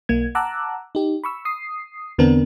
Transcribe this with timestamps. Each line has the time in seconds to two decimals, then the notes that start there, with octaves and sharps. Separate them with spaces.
0.09 B1 A#3 G#6
0.35 F#5 A5 A#5 D6 E6 F#6
0.95 D#4 G4
1.24 B5 C#6 E6
1.45 D#6 C7
2.18 E2 D3 B3 C4 D4 A#4